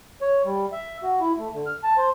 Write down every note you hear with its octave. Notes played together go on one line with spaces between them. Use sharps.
C#5
G3
E5
F#4
E4
A3
D3
F6
A5
C5